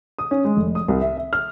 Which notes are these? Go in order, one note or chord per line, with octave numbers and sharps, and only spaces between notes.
D#6
C#4
G#3
F1
D#6
C2
E5
E5
F6